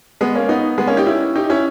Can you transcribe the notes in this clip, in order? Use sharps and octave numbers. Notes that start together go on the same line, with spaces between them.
G#3 B3
A#3 C#4
B3 D#4
G#3 B3
A#3 C#4
D#4 G4
C#4 E4
D#4 G4
C#4 E4